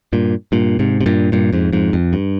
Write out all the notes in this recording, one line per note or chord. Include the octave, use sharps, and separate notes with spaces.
G2 A#2
G2 A#2
G#2 C3
C3
G2 A#2
G2 A#2
F2 G#2
F2 G#2
F2
G2